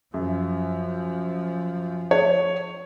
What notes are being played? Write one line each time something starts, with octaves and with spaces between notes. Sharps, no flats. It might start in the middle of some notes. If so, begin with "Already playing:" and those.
F#2 F3
C#5